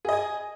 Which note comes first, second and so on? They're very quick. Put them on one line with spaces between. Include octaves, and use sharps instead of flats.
G#4 D#5 G#5